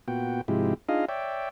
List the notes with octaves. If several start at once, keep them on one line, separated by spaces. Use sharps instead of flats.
A#2 B3 F#4 G5
G#2 C3 F3 G#3 E4 G4
D4 D#4 F4 G#4 D#5 F5
C#5 D5 E5 G5